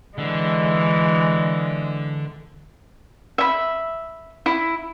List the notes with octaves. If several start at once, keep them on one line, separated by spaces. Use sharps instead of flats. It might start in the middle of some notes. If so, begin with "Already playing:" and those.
D3 E3 G#3
E5 B5
E4